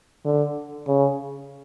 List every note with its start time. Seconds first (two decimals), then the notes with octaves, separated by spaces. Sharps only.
0.25 D3
0.87 C#3